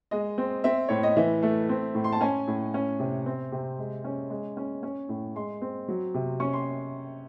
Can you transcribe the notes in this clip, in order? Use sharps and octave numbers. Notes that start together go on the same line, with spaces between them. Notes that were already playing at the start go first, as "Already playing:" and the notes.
G#3 D#5
C4
C4 E5
A2 C#5
D#5
E3 E5
A3
C4
A2
C6
A5
C#4 G#5
A2
C#4
C3
C4
C3
G#3
C#4
G#3
C#4
C#4
A2
G#3 C6
C4
F#3
C3
C#4 C#6
C6